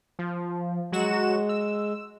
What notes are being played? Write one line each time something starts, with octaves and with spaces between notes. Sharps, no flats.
F3
F#3 G#3 F#4 E7
E6